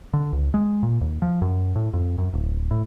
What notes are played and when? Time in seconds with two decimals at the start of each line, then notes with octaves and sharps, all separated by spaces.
0.13 D3
0.33 C#2
0.54 G#3
0.83 A#2
1.01 D#2
1.22 F3
1.42 F#2
1.75 A2
1.93 F2
2.18 F#2
2.33 D1
2.71 A2